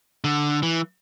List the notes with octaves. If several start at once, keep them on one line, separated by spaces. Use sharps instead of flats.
D3
E3